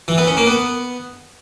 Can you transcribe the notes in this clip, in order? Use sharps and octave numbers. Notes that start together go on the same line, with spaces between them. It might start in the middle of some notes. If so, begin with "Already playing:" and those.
E3
B3
C#4
A#3
B3